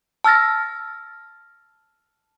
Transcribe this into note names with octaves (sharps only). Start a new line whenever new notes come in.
A5 E6 F6 A6 A#6